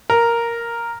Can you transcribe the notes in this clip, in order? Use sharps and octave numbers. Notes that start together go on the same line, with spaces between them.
A#4